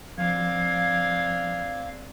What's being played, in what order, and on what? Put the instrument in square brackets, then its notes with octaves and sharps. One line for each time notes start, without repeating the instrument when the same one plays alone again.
[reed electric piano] F3 [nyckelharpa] C4 D4 [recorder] F5 [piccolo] G#6